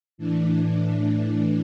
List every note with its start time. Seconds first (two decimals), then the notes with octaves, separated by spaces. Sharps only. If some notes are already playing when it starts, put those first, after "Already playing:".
0.18 A2 E3 D4